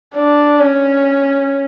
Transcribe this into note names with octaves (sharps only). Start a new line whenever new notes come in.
D4
C#4